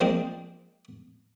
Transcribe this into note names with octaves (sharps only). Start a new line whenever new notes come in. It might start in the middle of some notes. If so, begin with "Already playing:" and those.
F3 G#3 A#3 C4 D4 D#4